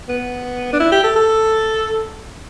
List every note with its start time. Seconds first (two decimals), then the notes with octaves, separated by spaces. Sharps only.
0.08 B3
0.73 D4
0.80 E4
0.92 G4
1.04 A4
1.16 A4